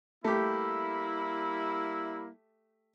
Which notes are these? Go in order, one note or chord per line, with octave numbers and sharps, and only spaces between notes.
G3 A3 A#3 E4 G4